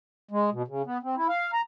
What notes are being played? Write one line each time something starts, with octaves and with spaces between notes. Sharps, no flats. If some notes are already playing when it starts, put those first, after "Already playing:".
G#3
B2
C#3
B3
C4
E4
F5
A#5